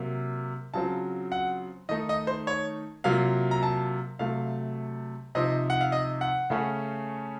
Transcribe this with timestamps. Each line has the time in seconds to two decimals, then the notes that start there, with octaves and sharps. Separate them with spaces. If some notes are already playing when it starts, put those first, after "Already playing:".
Already playing: C3 F#3 A#3
0.74 C#3 F#3 C4 F4 A5
1.32 F#5
1.89 D#3 A3 D#4 D#5
2.09 D#5
2.27 C5
2.47 C#5
3.04 C3 F#3 A#3 F4 F5
3.51 A#5
3.63 A5
4.19 C3 F#3 A3 F5
5.35 C3 F3 C4 D#4 D#5
5.70 F#5
5.81 F5
5.92 D#5
6.21 F#5
6.50 C#3 A3 C#4